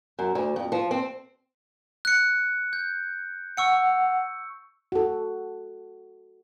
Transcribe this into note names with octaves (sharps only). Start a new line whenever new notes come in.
F#2
D2
F2
F3
C4
F#6 C#7
G6
F#5 C#6 E6 C#7
F#4 A4